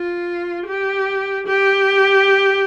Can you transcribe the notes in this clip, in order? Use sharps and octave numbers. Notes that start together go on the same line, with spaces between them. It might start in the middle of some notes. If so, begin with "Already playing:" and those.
Already playing: F4
G4
G4